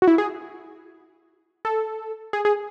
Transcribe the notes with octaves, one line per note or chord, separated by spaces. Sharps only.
F#4
E4
G#4
A4
G#4
G#4